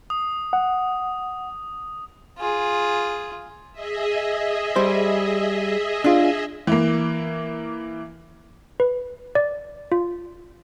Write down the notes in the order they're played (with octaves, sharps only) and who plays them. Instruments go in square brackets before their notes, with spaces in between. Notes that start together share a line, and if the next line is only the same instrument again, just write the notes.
[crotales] D#6
[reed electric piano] F#5
[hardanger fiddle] F4 G#4
[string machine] G#4 D#5 E5
[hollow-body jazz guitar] G3 C5
D4 F4
[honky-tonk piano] E3 A#3
[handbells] B4
D5
F4